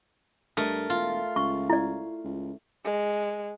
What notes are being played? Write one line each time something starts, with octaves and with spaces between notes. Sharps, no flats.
G2 A3 A#4 D#5 E6
E1 F4
C#2 C#6
E4 D5
C#2
G#3